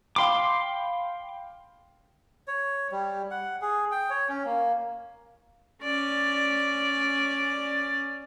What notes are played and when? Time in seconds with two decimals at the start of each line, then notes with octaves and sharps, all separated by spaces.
0.16 F5 G5 B5 C6 D6
2.47 C#5
2.91 G3
3.31 F#5
3.61 G#4
3.91 G5
4.10 C#5
4.29 C#4
4.45 A#3
5.83 C#4 D5